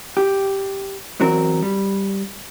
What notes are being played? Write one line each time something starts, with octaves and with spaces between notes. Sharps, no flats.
G4
E2 F#3 C4 A#4
G3